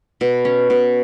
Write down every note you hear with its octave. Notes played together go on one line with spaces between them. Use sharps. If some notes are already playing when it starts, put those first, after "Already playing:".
B2
C#4
B2